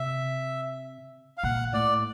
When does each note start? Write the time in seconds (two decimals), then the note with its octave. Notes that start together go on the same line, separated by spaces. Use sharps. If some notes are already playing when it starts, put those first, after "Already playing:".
Already playing: C3 E5
1.38 F5
1.43 A#2 F#5
1.73 A2 D5